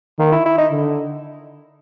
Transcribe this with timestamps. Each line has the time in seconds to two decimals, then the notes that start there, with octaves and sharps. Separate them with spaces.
0.19 D#3 A#3
0.32 E4
0.45 E4
0.58 D#4
0.71 D3